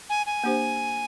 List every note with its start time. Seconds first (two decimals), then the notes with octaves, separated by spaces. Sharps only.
0.09 G#5
0.26 G#5
0.44 A#3 D4 G4 C5